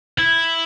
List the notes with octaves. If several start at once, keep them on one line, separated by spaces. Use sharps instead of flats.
E4